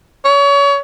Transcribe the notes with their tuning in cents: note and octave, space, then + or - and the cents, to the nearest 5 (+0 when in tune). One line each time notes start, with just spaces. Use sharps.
C#5 +30